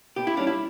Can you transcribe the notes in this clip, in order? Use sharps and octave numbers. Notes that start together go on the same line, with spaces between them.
B2 G4
E4
G3 C#4 D4
E4